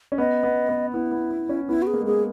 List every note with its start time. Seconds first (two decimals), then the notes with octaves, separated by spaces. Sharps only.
0.12 C#4
0.18 B3 D#5
0.43 B3
0.69 B3
0.93 B3 E4
1.12 B3
1.31 B3
1.49 C#4
1.68 B3 E4
1.82 F#4
1.87 G#4
1.94 A#3
2.01 G#3
2.06 A#3 G#4